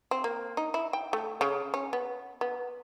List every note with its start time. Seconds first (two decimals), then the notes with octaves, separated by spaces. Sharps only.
0.11 C4
0.24 A#3
0.57 D#4
0.74 E4
0.93 G5
1.13 A3
1.41 C#3
1.74 C#4
1.93 B3
2.41 B3